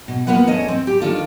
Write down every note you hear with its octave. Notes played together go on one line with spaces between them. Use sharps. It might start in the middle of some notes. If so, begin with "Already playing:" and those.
B2
A#3 B3 F4 B4 F#5
E2 A3 C#4 D#5
C4
G4
D#3 D4 F4 A4